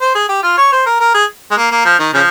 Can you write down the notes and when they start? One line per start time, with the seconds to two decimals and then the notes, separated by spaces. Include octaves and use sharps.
0.01 C5
0.15 G#4
0.29 G4
0.43 F4
0.58 C#5
0.72 C5
0.86 A#4
1.00 A#4
1.14 G#4
1.51 G#3
1.57 A#3
1.71 A#3
1.85 F3
1.99 D#3
2.13 C#3 F3